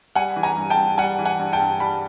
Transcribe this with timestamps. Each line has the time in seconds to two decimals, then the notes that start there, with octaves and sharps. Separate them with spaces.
0.15 G3 F#5 G#5
0.36 E3
0.43 G#5 A#5
0.57 G2
0.70 G5 A5
0.78 G2
0.98 G3 F#5 G#5
1.19 E3
1.25 F#5 G#5
1.39 G2
1.53 G5 A5
1.60 G2
1.80 G3 A5 B5